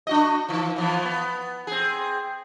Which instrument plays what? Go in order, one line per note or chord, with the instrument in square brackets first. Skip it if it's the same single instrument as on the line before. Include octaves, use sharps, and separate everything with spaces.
[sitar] D4 F#4 D#5
D#3 F3
E3 F3 B3
B3
C4 G#4